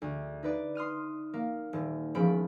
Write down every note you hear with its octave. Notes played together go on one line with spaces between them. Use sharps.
D2
D#4 B4 D5
C6 D#6 F6 D#7
A#3
D#1
E1 F3 C#4 B5 D7